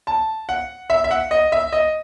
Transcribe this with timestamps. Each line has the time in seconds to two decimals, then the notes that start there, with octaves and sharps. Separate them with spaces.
0.07 A5
0.49 F#5
0.90 E5
1.04 E5
1.11 F#5
1.31 D#5
1.52 E5
1.73 D#5